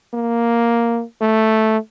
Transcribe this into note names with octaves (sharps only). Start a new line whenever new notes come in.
A#3
A3